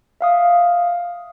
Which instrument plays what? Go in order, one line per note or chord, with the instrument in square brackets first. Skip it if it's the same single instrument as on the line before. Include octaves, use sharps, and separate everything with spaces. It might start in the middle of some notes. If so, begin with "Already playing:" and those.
[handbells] E5 F5 D#6